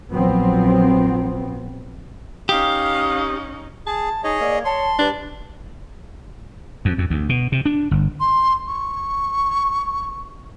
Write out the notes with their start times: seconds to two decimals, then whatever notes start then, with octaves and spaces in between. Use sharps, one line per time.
0.12 A#1 F3 F#3 B3 C4
2.49 C#4 D#4 G4 F5 D#6
3.86 G#4 A5
4.24 D#4 G#4 C#5 D#5
4.40 A#3 D5
4.65 C#5 A5 C6
4.99 G3 D4 B4
6.85 F2
6.98 F2
7.10 D2
7.29 B2
7.52 C3
7.66 D4
7.91 G1
8.20 C6
8.67 C#6